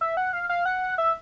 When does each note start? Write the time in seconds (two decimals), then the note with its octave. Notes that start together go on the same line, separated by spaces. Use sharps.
0.01 E5
0.17 F#5
0.33 F5
0.49 F5
0.65 F#5
0.98 E5